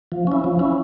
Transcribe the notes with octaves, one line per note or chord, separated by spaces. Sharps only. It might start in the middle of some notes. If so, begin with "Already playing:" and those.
F3
C#4 E4
F3
C#4 E4